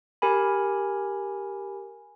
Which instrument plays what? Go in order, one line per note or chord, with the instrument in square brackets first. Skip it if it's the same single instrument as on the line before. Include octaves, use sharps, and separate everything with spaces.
[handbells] G4 A#4 G#5 B5